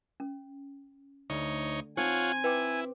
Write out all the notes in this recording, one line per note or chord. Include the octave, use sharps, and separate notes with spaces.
C#4
D2 D#4 C#5
C4 D#4 F4 C#5 F#5 G#5
E4 B4 G5 D6